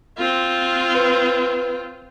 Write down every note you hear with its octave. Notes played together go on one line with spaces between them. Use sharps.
C4 F4
B4